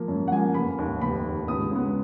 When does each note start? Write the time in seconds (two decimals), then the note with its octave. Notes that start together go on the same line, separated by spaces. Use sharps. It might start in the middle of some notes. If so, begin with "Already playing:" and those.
Already playing: F3 A#3
0.08 F#2
0.28 F#5
0.32 F3 A#3 G#5
0.54 F1 B5
0.78 D#2 D#3
1.02 F1 B5
1.24 D#2 D#3
1.48 C#2 D#6
1.71 C#3 G#3 B3